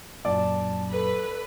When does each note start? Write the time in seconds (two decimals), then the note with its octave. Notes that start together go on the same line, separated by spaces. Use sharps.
0.25 F#2 A#2 D5 A5
0.92 A4 B4